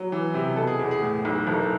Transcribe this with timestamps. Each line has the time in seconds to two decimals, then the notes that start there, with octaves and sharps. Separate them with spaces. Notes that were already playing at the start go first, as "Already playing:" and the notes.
Already playing: F#3
0.12 E3
0.34 C3
0.56 B2 A4
0.67 G#4
0.79 E2 G#4
0.91 G#4
1.02 A2
1.25 B1
1.47 F#1 A4